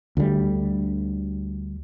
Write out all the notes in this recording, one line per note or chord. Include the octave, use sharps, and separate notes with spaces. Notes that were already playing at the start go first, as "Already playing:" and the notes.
D2 D3 F3 G3